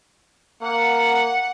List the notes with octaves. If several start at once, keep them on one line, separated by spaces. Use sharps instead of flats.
A#3 F#5